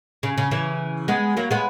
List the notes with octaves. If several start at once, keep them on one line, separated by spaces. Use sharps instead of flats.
C#3
C#3
C#3 E3
G#3 B3
F#3 A#3
G#3 B3